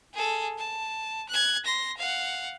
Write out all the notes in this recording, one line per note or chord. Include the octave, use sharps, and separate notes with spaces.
G#4 A4
A5
F#6 G#6
C6 A#6
F5 F#5